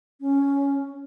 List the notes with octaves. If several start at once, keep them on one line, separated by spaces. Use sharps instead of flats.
C#4